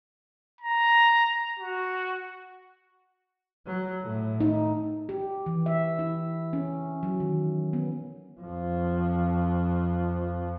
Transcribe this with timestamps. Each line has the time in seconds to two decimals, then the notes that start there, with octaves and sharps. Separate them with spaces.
0.61 A#5
1.59 F#4
3.66 F#3
4.02 A2
4.41 D#4
5.09 G4
5.46 E3
5.66 E5
5.99 E4
6.53 C#4
7.03 F#3
7.20 D#3
7.73 B3
8.41 F2 F3